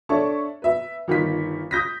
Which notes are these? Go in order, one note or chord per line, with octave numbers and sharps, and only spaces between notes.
D4 A4 C#5 E5 C#6
B4 E5
G1 D#3 F4 B6
D#6 G6 A#6 B6